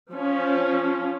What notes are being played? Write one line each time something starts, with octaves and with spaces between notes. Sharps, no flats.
F3 C#4